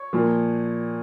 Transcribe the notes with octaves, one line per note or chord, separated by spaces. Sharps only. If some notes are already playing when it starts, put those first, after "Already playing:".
Already playing: C#5
A#2 F3